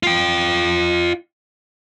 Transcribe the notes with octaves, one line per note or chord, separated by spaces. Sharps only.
F4 G5